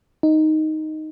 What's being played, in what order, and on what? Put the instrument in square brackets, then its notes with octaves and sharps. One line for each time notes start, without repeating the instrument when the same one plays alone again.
[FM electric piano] D#4